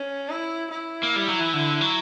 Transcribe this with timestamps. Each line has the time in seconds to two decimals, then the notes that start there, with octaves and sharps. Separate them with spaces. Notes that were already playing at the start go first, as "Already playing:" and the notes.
Already playing: C#4
0.29 E4
0.71 E4
1.03 A#3
1.16 G3
1.28 F#3
1.40 E3
1.54 D3
1.81 F#3